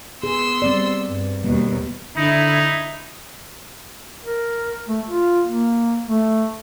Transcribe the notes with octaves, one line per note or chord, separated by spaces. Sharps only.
B3 G#4 C6 E6
G3 C4 D5
G2
D#2 B2 G3
D3 D#4 E4
A#4
A3
F4
A#3
A3